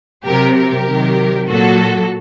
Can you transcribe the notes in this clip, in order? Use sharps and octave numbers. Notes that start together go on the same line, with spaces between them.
C3 F#3 G4 A#4
G4 A#4
C3 D#3 F#3
A#2 F#3 F#4 A4